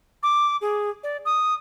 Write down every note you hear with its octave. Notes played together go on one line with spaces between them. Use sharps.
D6
G#4
D5
D#6